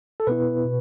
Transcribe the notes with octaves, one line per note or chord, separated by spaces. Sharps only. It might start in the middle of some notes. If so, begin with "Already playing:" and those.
A4
B2 B3 E4 B4
B2